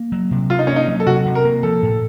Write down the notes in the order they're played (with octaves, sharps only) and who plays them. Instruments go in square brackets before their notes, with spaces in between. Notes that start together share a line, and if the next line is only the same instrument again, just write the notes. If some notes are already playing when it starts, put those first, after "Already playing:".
Already playing: [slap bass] A#3
F#3
C3
[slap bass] C3 [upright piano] F4
[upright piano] D#4
[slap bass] A#3 [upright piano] C#4
[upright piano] D#4
[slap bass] F#3
[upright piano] A4
[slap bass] C3 [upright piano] F#4
[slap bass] C3
[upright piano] A#4
[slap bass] A#3
[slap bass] F3 [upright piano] A4
[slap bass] A2